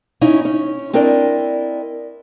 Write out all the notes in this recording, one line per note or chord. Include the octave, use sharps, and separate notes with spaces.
C#4 D#4 E4
C#4
C4 D4 E4 A#4 D5 D#5